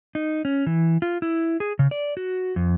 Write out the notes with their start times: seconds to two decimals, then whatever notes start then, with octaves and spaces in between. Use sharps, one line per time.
0.15 D#4
0.45 C#4
0.67 E3
1.02 F4
1.22 E4
1.60 G#4
1.79 C#3
1.91 D5
2.17 F#4
2.56 F2